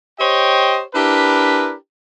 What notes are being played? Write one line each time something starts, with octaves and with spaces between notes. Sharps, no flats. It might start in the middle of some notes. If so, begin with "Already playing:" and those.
G4 C5 C#5 D#5 G5
D4 E4 G4 A#4 B4